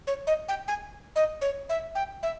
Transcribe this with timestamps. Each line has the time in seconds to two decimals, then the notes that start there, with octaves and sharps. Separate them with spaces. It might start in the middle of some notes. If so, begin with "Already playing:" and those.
0.07 C#5
0.27 D#5
0.48 G5
0.68 G#5
1.16 D#5
1.41 C#5
1.69 E5
1.95 G5
2.23 E5